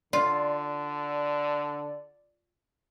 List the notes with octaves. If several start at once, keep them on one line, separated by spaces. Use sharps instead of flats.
D3 F4 D5